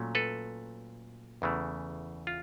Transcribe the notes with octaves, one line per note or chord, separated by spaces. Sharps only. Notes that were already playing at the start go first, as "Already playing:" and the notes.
Already playing: A#2 F#3 A3 C#4
A4 B4
E2 C#3 E3 A3
F4